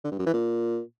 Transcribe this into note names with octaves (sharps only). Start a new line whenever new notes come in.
D3
G2
F#2
E3
A#2